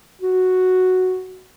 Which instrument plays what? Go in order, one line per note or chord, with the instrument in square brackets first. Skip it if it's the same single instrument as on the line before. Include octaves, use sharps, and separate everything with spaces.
[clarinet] F#4